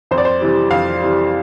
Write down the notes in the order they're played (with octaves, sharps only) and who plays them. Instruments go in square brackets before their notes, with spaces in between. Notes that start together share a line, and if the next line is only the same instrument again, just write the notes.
[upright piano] F2 C5
D5
C5
C3 E3 G3
F2 F5
C3 E3 G3